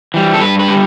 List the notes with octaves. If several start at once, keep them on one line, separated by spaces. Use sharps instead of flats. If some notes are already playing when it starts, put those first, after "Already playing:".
E3 G3
A4
G2 B4
B4
D3 G3